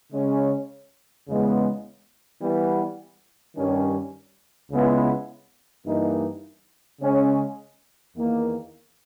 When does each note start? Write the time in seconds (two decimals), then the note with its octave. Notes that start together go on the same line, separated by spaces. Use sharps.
0.12 C#3 G#3 C#4
1.27 E2 C#3 G#3 B3
2.42 E3 G3 B3
3.56 G2 D#3 G3 C#4
4.71 C#2 C#3 G#3 B3 E4
5.86 G2 E3 A#3 D#4
7.00 C#3 G#3 C#4
8.15 E2 D#3 A#3